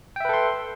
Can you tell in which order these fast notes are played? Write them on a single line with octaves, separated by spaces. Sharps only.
G5 E5 B4 A4 C6